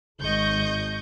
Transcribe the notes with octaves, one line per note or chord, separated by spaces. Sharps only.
G#1 D#5 C#6 G6